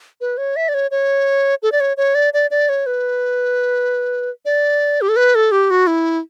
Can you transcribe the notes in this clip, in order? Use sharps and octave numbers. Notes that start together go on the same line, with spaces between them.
B4
C#5
E5
D5
C#5
C#5
A4
D5
C#5
C#5
D5
D5
D5
C#5
B4
D5
G4
A4
B4
A4
G4
F#4
E4